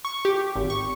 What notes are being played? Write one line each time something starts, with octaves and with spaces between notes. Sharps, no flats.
C#6
G4
G#1
C#6